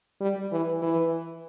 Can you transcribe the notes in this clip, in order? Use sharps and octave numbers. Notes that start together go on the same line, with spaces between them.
G3
E3
E3